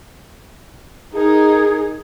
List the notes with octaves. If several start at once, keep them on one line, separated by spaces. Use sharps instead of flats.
D#4 G#4 A#4